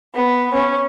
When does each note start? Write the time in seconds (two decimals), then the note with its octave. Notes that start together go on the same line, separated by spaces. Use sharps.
0.15 B3
0.54 C#4